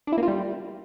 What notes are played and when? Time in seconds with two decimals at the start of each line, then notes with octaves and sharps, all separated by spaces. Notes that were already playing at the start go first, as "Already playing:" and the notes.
0.07 D4
0.12 E4
0.18 A#3
0.23 F4
0.28 G3